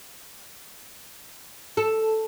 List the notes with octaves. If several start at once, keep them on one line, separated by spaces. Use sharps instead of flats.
A4